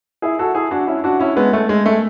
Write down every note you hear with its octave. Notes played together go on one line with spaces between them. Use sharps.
E4 G#4
F#4 A4
E4 G#4
D4 F#4
C#4 E4
D4 F#4
C#4 E4
G#3 B3
A3
G#3
A3